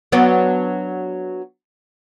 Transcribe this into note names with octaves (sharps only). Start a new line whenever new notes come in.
F#3 B3 D4